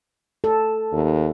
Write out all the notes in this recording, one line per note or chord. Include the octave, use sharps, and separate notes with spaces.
A4
D#2